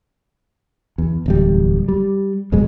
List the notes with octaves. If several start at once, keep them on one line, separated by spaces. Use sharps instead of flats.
E2
D1 E2 G3
G3
D#1 F2 B2 G#3